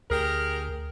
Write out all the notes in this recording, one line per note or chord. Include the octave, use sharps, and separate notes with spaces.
D2 G4 G#4 A#4